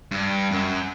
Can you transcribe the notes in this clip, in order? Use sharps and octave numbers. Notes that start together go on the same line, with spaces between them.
G2
F#2